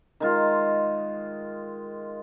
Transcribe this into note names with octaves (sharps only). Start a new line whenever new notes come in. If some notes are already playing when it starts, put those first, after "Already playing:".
D#3 G#3 F4